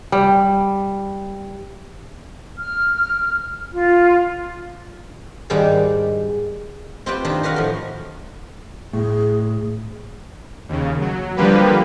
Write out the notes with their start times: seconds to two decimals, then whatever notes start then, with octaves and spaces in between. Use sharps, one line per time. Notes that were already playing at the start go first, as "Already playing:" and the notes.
0.12 G3
2.60 F6
3.73 F4
5.50 G#2 D#3 G3 G#3 D4 F#5
7.06 C4 F4 G4 B4 E5 G5
7.24 D#3 D4 D#4 F4 G4
7.43 D#4 F#4 B4 F5 F#5
7.56 A2 F3
8.93 A2 G#4
10.69 D#2 C#3
11.01 F#3
11.36 D3 F3 G3 A#3 G4 B4